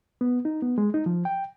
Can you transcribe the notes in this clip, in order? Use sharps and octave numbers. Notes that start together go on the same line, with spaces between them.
B3
D#4
B3
G#3
D#4
F3
G5